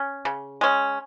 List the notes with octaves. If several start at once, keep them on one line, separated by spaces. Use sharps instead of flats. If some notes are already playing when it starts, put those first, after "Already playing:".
Already playing: C#4
C#3
G#3 C#4